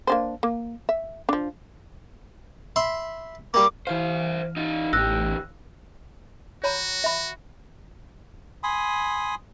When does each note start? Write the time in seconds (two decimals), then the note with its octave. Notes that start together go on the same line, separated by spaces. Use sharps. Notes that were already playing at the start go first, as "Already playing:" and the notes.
0.07 A#3 D4 C5
0.43 A#3
0.89 E5
1.29 F3 D4
2.76 E5 B5 C6
3.54 G3 A#3 D6
3.87 E3 E4 C5 F5
4.57 D#4 F4
4.93 A1 E2 G4 E6 F#6 A#6
6.64 F#4 C#5 A#5 B5
7.04 E5 B5
8.63 G#5 B5 C6 D#6